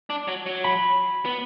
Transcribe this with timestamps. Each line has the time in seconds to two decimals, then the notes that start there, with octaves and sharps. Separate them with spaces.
0.10 D4
0.28 F#3
0.46 F#3
0.64 B5
1.25 B3